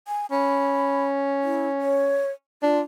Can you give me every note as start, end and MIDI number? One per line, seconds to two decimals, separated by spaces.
0.08 0.26 80
0.32 2.23 61
0.32 1.05 83
1.43 1.67 64
1.81 2.30 73
2.63 2.80 62
2.63 2.81 65